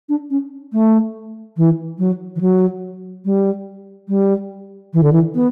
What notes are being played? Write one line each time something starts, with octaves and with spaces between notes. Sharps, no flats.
D4
C#4
A3
E3
F#3
E3
F#3
G3
G3
E3
D3
E3
B3